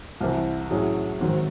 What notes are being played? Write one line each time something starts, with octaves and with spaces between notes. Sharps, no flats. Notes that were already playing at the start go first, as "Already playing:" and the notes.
C2 C3 E3
A2 F#3 C#4 G#4
G#2 D#3 F#3 C4